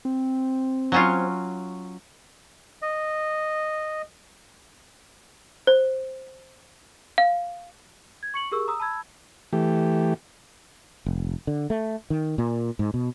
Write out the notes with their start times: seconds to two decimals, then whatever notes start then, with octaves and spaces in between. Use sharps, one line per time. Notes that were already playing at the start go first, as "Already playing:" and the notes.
0.05 C4
0.92 F#3 C#4 F4
2.82 D#5
5.67 C5
7.18 F5
8.23 G#6
8.34 C#6 C#7 F#7
8.51 G4 G#4 A#4 C#6 E6
8.68 A#5 D#6 E6
8.80 A5 B5 E6 G#6
9.53 E3 A3 G4
11.06 F1
11.47 D3
11.70 A3
12.10 D#3
12.38 A#2
12.79 G#2
12.94 B2